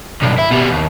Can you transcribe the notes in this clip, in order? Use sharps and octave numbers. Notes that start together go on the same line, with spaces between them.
B1 G2
E4
B2 G3
D#2